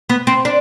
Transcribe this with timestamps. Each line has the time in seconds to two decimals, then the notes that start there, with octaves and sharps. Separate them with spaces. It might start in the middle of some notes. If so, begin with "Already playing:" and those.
0.09 B3
0.27 C4
0.45 D4